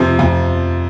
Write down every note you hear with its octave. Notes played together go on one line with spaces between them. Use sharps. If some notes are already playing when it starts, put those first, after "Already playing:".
Already playing: F2 C3 F3
F2